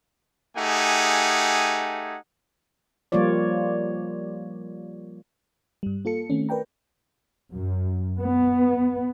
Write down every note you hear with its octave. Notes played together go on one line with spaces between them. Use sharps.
A3 D#4 G4 G#4 F#5 G#5
F3 G3 A#3 F4 C#5 D5
G2 G3
A#3 F4 A4 C#7
D#3 A3 C4 C#4
A#4 B4 D5 G5 A#5
F#2
B3